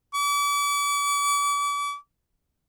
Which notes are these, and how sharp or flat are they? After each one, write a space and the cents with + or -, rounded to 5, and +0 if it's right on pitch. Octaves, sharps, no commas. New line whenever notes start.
D6 -40